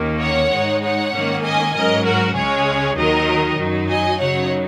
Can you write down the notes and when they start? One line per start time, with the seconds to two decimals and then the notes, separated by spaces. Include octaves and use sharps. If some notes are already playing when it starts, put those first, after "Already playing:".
Already playing: D#2 D#3 A#3 C#4
0.20 C#5 F#5
0.52 G#2 G#3 D#4
0.82 C#5 F#5
1.13 G#2 D#3 A#3 C#4
1.43 D#5 G#5
1.75 G#2 F#3 C#4 A#4 D#5
2.05 F#4 A#4
2.36 C#2 C#3 G#3 C#4 G#4 C#5
2.97 D#2 D#3 F#3 D#4 A#4 D#5
3.58 F#2 F#3 D#4
3.89 D#5 G#5
4.20 F#2 C#3 F#3 D#4 C#5 F#5